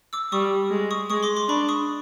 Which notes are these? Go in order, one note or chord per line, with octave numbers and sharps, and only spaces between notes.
D6 E6
G3 C#6 D#6
G#3
C#6 D#6
G#3 C#6 D#6
C6 D6
C6 D6
D4 B5 C#6
C#6 D#6